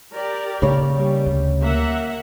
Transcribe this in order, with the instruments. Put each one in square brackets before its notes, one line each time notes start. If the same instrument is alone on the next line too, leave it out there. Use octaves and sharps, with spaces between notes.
[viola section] G4 A#4 D5
[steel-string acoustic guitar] C#3 C#5 [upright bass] A#3
[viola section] G3
[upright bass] D2
[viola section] A#3 E5 F#5